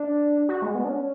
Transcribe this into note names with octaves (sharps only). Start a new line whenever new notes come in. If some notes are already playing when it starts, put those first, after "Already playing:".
Already playing: D4
F#4
G#3
B3
D4
C#4